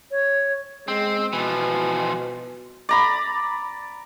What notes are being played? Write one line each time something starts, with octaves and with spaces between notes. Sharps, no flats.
C#5
G#3 C4
B2 E3 F3
D5 A#5 B5